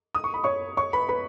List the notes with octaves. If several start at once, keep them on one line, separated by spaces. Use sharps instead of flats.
D#6
C#6
B5
C#5 C#6
C#5 C#6
B4 B5
B4 B5